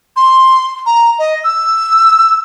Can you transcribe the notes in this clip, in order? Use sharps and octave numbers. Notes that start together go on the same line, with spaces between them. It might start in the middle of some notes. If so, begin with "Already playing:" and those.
C6
A#5
D#5
E6